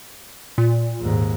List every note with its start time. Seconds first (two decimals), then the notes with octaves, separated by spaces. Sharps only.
0.58 A#2
1.00 D#2 G#2